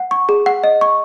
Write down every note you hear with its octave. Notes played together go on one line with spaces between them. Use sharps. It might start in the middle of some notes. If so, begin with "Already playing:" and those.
Already playing: F#5
C#6
G#4
F#5
D#5
C#6